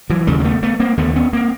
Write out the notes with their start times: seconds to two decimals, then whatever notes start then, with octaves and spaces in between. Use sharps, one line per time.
0.10 E3 F#3
0.27 D#2 C#3 G3 A3
0.40 A#3
0.44 A3 B3
0.63 A3 B3
0.80 A#3 C4
0.97 D#2 D3 A3 B3
1.16 B3 C#4
1.33 A#3 C4